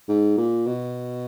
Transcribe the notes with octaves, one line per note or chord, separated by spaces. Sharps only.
G#2
A#2
B2